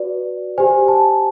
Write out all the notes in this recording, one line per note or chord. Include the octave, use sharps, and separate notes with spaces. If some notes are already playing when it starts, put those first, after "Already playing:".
Already playing: F#4 B4 D5
G4 C5 G#5
A5